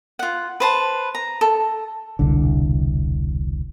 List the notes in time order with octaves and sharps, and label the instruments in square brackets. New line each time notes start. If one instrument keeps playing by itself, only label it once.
[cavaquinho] F4 F#5
B4 C5 A5
A#5
A4
[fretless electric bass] E1 C2 D3